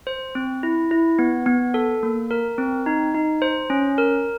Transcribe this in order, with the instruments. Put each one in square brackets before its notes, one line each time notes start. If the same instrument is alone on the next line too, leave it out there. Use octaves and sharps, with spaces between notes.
[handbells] C5
C4
E4
E4
B3
B3
A4
A#3
A#4
C4
D#4
D#4
C5
C#4
A#4